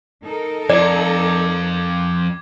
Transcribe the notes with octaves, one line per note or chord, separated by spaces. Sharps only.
D#4 A4 A#4
F2 D5 D6 G#6